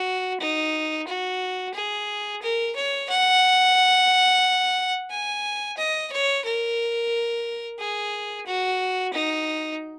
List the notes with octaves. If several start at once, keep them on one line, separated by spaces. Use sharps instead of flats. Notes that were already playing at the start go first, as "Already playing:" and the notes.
Already playing: F#4
D#4
F#4
G#4
A#4
C#5
F#5
G#5
D#5
C#5
A#4
G#4
F#4
D#4